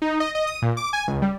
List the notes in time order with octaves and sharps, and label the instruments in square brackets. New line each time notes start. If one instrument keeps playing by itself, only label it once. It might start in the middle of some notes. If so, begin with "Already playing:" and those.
[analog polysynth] D#4
D#5
D#5
D#6
A#2
D6
G#5
C#2
G3